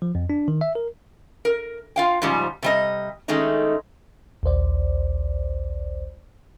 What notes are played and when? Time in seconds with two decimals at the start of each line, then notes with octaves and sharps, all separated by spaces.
0.02 F3
0.15 F2
0.30 D4
0.48 D#3
0.61 E5
0.75 A#4
1.45 A#4
1.96 F4 F5 G5
2.22 G#2 C#3 F3 G3
2.63 C3 G3 D#5
3.28 D#3 G#3 A3 C#4 D#4
4.43 A#1 D#2 C5 D5